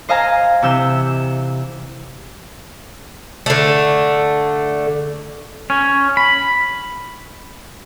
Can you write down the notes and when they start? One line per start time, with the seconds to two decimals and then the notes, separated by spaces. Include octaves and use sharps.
0.09 C5 D#5 F5 G#5 A#5
0.62 C3 E3 E6 G6
3.46 D3 A3
5.70 C#4
6.17 B5